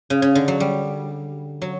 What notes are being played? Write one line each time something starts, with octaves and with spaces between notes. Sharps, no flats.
C#3
C#3
D3
F#3
G3
F#3